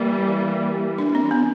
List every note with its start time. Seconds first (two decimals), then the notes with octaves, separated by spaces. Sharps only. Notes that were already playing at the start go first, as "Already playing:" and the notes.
Already playing: E3 G3 A#3
0.98 D4
1.15 C4
1.31 B3